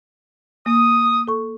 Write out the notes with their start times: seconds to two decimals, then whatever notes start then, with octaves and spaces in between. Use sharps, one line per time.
0.66 A#3 D#6
1.28 A4 C#6